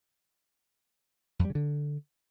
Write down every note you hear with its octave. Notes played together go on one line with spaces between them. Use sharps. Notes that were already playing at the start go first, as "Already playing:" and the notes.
F2
G3
C#3
D3